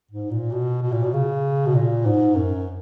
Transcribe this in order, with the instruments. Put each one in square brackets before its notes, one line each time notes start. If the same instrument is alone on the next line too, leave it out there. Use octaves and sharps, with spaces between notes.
[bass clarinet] G#2
A#2
B2
B2
A#2
B2
C#3
B2
A#2
G#2
F#2